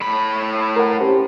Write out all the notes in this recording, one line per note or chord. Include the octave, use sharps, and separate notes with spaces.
A2 B5
A#4 F#5
C#4 G4 C5